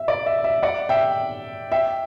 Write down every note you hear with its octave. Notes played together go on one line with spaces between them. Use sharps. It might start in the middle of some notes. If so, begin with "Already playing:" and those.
Already playing: E5
D5
E5
E5
D5 F#5
E5 G5
E5 G5